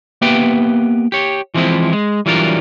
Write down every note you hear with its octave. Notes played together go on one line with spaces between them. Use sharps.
A#3 B3 G4 B4 E5 G5
G4 C#5
E3 F3 G#3 C4 E4
G#3
E3 F#3 G3 D4 F4 A#4